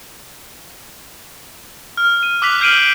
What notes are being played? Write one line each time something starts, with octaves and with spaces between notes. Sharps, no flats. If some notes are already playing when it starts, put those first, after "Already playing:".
F6
D#7
D6 E6 F#6 B6 F7
F6 G6 C7 D7 D#7 F#7